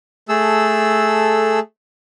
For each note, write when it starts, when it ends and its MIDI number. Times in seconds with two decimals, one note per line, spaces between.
0.29 1.60 57
0.29 1.60 68
0.29 1.60 69
0.29 1.60 88